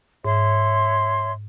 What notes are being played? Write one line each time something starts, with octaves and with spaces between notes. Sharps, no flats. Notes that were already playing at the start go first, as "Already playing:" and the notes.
G#2 C#5 E5 C6